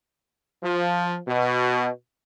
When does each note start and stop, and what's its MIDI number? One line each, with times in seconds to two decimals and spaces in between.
0.63 1.17 53
1.28 1.89 47